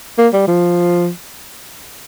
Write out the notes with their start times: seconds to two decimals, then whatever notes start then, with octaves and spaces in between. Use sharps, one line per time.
0.18 A#3
0.33 G3
0.48 F3